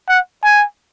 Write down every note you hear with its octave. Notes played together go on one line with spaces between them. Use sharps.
F#5
G#5